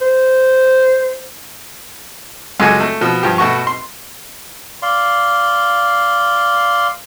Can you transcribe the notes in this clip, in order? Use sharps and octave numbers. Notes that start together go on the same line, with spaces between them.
C5
C#2 F#2 G#3 F#4 A4 G#5
A3
B2 F3
G2 F3 G4
B2 A3 F#4 C#6
C6
D5 F5 C6